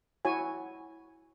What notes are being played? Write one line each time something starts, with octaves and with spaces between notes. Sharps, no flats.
E4 F#4 C#5 G#5